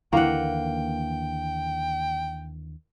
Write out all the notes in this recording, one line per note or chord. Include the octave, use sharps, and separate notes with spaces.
D#2 D3 E3 A#3 E4 F#5 G5